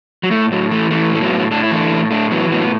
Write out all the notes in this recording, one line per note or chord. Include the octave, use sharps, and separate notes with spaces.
F#3
A2 A3
A2 F#3
E3 A3
E3 A3
A2 A3
F#3 B3
A2
A2 D4
E4
E3 A3 D4
A2
A2 A3 D4
E3 F#3 B3
A2 F#3 B3
B3